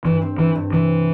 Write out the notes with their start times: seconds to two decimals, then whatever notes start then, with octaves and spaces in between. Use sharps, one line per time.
0.05 G2 E3
0.22 C4
0.39 E3 C4
0.56 G2
0.73 C3 E3